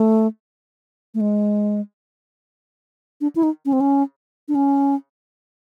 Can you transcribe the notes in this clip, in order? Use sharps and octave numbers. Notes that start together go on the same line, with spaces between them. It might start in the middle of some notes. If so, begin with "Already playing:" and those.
Already playing: A3
A3
G#3
D4
E4
D#4
C#4
C4
C#4
D4
C#4